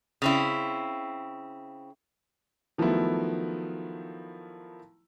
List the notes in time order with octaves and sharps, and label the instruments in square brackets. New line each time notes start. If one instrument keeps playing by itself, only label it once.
[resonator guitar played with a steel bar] C#3 C4 E4
[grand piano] D#3 F3 F#3 A3 B3 E4